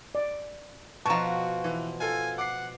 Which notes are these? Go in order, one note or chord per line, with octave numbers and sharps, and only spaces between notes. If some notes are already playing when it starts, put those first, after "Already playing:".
D5
B2 F3 F#4 A5 A#5 C#6
E3
F4 A4 G#5
F#5 D6 C7